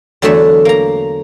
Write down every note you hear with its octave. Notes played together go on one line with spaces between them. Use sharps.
E2 D3 F#3 A3 F#4 E5
A#3 A#5